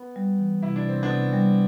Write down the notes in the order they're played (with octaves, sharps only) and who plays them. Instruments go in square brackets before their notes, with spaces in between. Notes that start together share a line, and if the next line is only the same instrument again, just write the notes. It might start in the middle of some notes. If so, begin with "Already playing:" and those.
Already playing: [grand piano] B3
[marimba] G3
E3
[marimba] C3 [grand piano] E4
[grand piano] D4
[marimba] C3 [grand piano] C4
[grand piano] B3 D4
[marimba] C3
G3